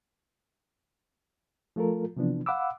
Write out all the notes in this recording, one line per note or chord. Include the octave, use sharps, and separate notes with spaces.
F3 A3 F4 A4 A#4
C3 E3 F3 B3 D4
F5 F#5 B5 D6 E6